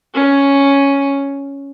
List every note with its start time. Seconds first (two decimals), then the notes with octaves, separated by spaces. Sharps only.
0.14 C#4